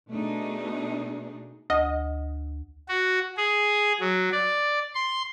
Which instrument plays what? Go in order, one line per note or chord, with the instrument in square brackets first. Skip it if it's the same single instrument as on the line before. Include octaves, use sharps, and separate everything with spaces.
[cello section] B2 A3 D4 D#4 G#4
[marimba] D2 [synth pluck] D#5
[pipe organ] F#4
G#4
F#3
D5
C6